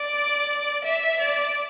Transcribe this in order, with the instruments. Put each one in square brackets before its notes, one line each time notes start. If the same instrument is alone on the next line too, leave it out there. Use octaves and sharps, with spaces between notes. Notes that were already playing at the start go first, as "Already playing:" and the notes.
Already playing: [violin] D5
E5
D5